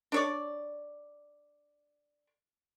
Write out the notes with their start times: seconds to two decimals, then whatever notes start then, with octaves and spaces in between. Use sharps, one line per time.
0.12 D4 C#5 D5